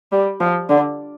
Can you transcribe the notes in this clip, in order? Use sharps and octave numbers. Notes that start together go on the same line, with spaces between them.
G3
F3
D3